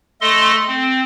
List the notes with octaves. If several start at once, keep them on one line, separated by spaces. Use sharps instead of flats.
A3 A4 D#5 C6
C4